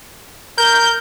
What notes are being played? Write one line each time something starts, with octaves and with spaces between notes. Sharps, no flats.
A#4 G6